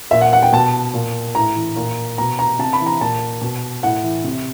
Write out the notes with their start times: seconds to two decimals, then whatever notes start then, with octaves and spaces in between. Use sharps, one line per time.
0.11 A#2 E5
0.21 F#5
0.33 F#5
0.43 G5
0.53 B2 A5
0.94 A#2
1.35 A2 A#5
1.56 E3
1.76 A#2
2.18 B2 A#5
2.39 A#5
2.59 C3 A5
2.73 B5
2.80 E3
2.86 A#5
3.01 A#2 A5
3.41 B2
3.83 A2 F#5
4.03 E3
4.24 C3